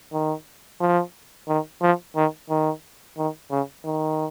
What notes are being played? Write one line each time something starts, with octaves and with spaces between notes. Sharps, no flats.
D#3
F3
D#3
F3
D#3
D#3
D#3
C#3
D#3